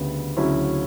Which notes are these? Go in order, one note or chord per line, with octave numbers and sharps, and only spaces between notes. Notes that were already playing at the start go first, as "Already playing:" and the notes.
Already playing: D2 C#3 G3 B3
D2 C#3 F#3 C#4 E4